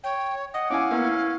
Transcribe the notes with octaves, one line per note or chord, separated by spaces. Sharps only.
C#5 G5
D#5 F#5
C#4 E4 F5 G#5 D6
A#3 B3 C#4 E4
E4